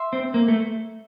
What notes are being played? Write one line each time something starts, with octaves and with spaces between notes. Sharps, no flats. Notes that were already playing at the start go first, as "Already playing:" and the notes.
Already playing: E5 C6
C4
A#3
A3